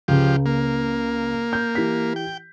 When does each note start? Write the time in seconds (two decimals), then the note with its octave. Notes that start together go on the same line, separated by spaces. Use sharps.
0.08 C#2 C#3 F3 G4
0.46 A#3
1.53 G6
1.75 E3 G4 B6
2.16 G5